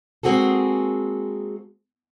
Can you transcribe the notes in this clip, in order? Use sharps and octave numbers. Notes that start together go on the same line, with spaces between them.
G#3 A#3 C4 F#4 G#4 A4